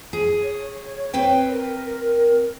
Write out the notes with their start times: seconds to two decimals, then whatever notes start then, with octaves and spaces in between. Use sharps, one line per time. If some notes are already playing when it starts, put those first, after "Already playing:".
0.13 G#4
0.43 C#5
1.14 C4 B4 G5
1.50 A#4